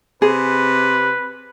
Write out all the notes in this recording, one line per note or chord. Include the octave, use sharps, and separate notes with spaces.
C3 G#4 B4